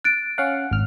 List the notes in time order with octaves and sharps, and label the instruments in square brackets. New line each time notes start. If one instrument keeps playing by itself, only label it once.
[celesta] F#6 A6 D7
[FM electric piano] C#4 F5 F#5
G#1 F6